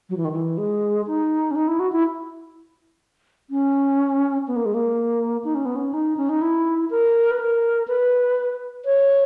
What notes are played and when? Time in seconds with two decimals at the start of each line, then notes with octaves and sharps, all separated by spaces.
0.10 F#3
0.17 E3
0.25 D#3
0.32 E3
0.58 G#3
1.07 D#4
1.51 C#4
1.56 D#4
1.68 E4
1.79 F#4
1.92 E4
3.50 C#4
4.48 B3
4.56 A#3
4.66 G#3
4.74 A#3
5.44 D#4
5.55 C#4
5.65 B3
5.76 C#4
5.94 D#4
6.17 C#4
6.29 D#4
6.42 E4
6.90 A#4
7.31 B4
7.39 A#4
7.88 B4
8.85 C#5